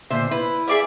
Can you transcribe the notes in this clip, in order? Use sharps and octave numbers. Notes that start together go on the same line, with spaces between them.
A#2 D3 C5 E5
E4 B4
G#4 D5 E5